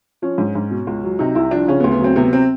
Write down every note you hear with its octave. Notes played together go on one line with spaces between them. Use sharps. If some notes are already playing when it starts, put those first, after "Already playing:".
F3 C#4
G#2
G#2
B2
C#2
F#3
C3 D#4
C2 E4
F3 D4
C#3 C#4
B3
D2
B3
F#3 C4
C3 B3
C4